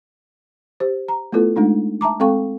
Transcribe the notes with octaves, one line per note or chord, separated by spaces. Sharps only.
G4 C5
A#5
A3 B3 E4 F4 A4 B4
G#3 A3 D4 D#4
E5 A5 A#5 D6
G#3 C4 A4 F5 G5 C#6